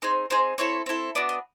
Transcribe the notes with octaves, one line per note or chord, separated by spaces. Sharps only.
C4 D#4 G#4 C5
C4 D#4 G#4 C5
C4 E4 A4 C#5
C4 E4 A4
B3 D4 F#4 D5
D#5